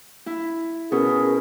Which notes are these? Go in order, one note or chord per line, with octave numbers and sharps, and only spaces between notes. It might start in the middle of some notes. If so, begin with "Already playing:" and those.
E4
B2 C#4 G#4 A#4